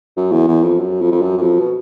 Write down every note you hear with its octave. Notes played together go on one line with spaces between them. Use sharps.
F#2
E2
E2
F2
F#2
F2
F2
F#2
F#2
F2
B2